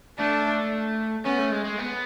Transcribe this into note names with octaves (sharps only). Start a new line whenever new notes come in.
A3 D4
B3 C#4
A3
G#3
G#3
B3